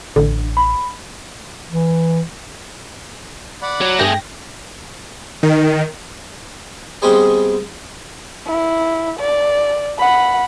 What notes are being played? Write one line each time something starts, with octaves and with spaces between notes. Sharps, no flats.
A1 D3
B5
E3
D5 F#5 B5
F#3
G2 A3 G#4 G5 A#6
D#3
G3 G#3 B3 C4 G4 G#4
E4
D5
F#5 B5